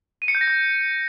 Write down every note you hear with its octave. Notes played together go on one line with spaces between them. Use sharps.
D#7
C#7
G6
A#6
G6